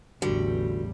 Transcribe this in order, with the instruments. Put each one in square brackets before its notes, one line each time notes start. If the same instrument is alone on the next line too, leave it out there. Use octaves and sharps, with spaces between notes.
[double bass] A1 E2 [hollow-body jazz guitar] D3 [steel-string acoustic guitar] G3 [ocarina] F#4